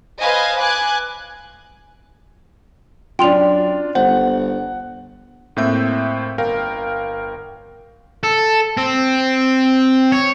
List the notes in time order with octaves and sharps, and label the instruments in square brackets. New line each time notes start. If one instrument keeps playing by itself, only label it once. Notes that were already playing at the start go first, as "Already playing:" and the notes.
[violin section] B4 C5 D#5 F5 G#5
G#5 D6 F#6 G#6
[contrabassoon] F#2 [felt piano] D4 F4 [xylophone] G5 C6 F7
[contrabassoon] G1 [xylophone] C5 [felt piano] F#5
[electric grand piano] A2 A#3 C4 E5 G6
G1 A#4 F5 G5
[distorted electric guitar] A4
C4
C#5